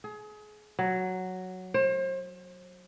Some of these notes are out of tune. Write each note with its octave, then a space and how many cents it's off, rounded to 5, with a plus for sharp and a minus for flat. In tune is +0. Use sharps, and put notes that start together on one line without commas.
G#4 +30
F#3 +0
C5 +40